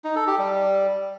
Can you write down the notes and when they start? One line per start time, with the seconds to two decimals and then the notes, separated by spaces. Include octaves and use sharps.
0.04 D#4
0.16 A4
0.27 G4
0.39 G3